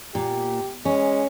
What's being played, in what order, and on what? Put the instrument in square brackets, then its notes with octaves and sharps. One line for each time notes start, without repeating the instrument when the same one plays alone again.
[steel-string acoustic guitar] A#2 [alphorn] G4
[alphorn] G#3 [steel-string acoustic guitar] C#4